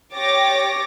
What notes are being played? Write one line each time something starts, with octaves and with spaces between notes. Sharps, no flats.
G4 C#5 D6 A6 A#6